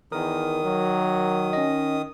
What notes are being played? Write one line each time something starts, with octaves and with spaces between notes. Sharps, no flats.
E2 D#3 A#4 D#6
F#3
C#4 D#5